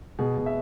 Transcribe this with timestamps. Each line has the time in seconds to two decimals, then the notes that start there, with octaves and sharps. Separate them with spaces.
0.19 B2 G#4
0.37 B2
0.46 E5